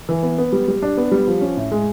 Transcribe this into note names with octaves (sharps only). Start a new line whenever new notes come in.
E3
B3
B3
G3
G3
D4
B3
G3
F3
C#4
A2
G#3